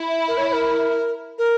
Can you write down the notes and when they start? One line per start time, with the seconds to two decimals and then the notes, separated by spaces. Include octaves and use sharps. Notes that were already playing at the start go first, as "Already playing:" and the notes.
Already playing: E4
0.28 A#4
0.38 C#5
0.49 C#5
0.53 A#4
1.38 A#4